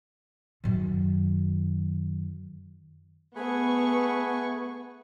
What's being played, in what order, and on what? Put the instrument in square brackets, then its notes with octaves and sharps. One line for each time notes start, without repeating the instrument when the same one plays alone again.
[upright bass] F#2 D#3
[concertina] A3 G#4 B4 [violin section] B3 C#6